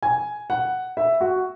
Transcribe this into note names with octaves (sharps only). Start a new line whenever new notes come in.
G#5
F#5
E5
F#4